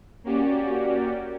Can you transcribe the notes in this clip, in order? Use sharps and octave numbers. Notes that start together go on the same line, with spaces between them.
A#3 C#4 F#4 G4 D5